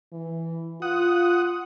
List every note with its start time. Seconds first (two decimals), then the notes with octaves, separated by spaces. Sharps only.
0.12 E3
0.82 F4 F#5 D#6